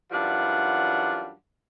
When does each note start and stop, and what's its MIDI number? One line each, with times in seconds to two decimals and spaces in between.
0.12 1.32 42
0.12 1.32 52
0.12 1.32 55
0.12 1.32 62
0.12 1.32 65
0.12 1.32 78